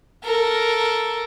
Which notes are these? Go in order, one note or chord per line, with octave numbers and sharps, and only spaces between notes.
A4 A#4